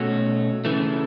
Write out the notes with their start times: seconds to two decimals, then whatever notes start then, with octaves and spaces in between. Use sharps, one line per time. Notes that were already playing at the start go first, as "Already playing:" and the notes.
Already playing: B2 A3 C#4 F#4
0.65 C#3 E3 A3